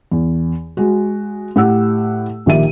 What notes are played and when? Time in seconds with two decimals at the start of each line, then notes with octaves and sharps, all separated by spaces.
0.12 E2
0.77 G#3 F#4
1.56 A2 G4 F#5 E6
2.46 A#1 D#3 G4 E5 D#7